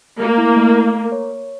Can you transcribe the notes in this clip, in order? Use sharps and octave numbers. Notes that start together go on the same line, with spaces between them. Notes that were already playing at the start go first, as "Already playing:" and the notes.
A3 A#3
E4
A3
F5
A#4
C#5
C#5